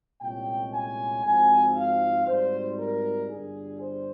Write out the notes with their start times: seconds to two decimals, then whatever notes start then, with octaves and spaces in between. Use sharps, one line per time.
0.21 C2 A#2 G#3 C#4 G5
0.73 G#5
1.24 G#1 G#2 F3 C4 G#5
1.75 F5
2.27 G#1 G#2 G3 C5
2.78 A#4
3.30 G1 G2 G3 G#4
3.81 C5